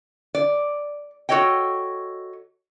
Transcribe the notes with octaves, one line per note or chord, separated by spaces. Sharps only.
D5
F#4 A4 C#5 D#5 G5